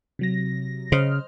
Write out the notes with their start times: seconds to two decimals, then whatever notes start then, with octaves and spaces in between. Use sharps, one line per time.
0.19 C3 F#3 A#6
0.92 C#3 C5 D#5 F6